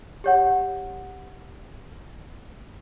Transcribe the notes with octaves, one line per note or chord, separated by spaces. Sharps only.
G4 C#5 F#5